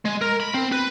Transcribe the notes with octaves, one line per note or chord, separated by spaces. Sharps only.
G#3
A#4
B5
C4
B4